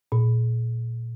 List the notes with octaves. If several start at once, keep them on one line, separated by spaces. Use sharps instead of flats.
A#2